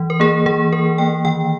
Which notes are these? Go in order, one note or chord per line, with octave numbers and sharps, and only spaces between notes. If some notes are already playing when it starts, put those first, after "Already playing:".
Already playing: E3
A#4
A#3 G#4
E3 G#4
E3 A#4
A#3 G5
D#3 G5